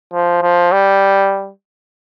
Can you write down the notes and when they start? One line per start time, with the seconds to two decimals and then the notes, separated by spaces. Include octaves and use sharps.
0.13 F3
0.42 F3
0.72 G3